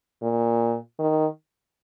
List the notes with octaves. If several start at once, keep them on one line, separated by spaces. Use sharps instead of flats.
A#2
D#3